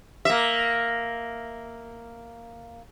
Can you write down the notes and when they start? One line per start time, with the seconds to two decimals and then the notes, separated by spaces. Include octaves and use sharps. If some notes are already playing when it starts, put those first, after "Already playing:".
0.25 A#3 E5